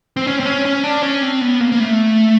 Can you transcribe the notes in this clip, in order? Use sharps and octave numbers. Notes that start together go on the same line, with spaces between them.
C4
C#4
C4
C#4
C#4
D4
C#4
C4
B3
A#3
A#3
A3